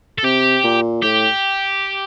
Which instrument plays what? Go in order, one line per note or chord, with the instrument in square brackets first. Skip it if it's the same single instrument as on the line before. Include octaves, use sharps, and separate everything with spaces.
[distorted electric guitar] A4
[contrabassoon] C3 [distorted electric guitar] G4
[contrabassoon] A#2
[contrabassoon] A2 [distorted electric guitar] G4